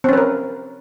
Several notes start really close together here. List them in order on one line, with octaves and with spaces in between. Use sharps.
C4 C#4 B4 A#4